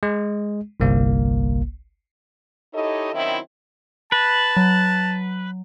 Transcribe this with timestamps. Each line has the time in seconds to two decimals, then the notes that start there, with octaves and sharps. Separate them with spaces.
0.03 G#3
0.80 G1 C2 A#3
2.73 D#4 E4 G4 A4 C#5 D#5
3.13 D#3 F#3 C4 C#4 E4
4.12 B4 A5
4.57 F#3